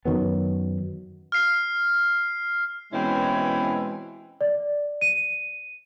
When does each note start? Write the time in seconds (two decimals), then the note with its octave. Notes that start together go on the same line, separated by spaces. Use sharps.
0.05 F#2 D#3 F#3 B3
1.32 F6 C7
2.92 B2 E3 G#3 C4 C#4 E4
4.41 D5
5.01 D#7